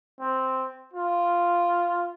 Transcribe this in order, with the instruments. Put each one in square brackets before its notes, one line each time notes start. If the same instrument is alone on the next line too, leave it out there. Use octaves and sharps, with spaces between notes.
[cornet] C4
F4